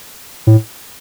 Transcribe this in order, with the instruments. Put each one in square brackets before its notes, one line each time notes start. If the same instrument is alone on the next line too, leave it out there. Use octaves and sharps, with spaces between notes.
[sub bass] A2